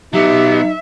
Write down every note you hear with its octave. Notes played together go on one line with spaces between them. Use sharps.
F#3 B3 D#4 G4 E5